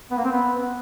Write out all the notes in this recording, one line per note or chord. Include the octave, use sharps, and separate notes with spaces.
B3
A#3
C4
B3